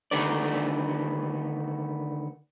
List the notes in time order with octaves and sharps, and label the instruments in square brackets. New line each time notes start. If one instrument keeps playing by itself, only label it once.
[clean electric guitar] D3 D#3 A3 B3 D4 D5